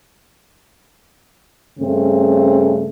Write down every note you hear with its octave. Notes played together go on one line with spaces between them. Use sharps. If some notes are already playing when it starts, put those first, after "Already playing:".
G2 C#3 A3 C4